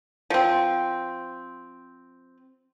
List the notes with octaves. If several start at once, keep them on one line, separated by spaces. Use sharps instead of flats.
F3 C4